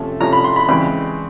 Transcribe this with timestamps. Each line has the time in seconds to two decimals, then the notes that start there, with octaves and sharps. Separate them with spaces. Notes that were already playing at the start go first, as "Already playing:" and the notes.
Already playing: C3 F3 A3 C#4
0.20 C3 F3 A3 C#4 A#5
0.33 B5
0.44 C6
0.56 B5
0.68 C#3 E3 G#3 C4 B5